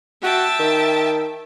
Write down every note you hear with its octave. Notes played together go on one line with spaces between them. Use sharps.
F#4 E5 G5 A5
D#3